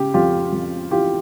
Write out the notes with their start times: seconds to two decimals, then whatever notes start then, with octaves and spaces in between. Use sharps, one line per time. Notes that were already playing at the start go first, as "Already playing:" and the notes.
Already playing: C#3 G4
0.14 F2 F4 G4
0.53 F2
0.91 E3 F4 G4